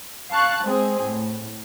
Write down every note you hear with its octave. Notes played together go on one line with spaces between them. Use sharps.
F5 A5 C#6 F#6
G#3 C4 G#4
A2